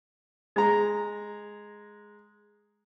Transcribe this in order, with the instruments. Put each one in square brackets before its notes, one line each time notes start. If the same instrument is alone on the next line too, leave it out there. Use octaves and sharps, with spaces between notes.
[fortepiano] G#3 A#5